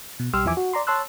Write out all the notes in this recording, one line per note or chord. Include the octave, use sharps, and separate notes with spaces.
B2
B1 G3 G4 C6 E6 F6
E2 E3 F3 E5 G#5 D6
F#4
D5 A#5 C6
C#5 A5 C6 E6 F#6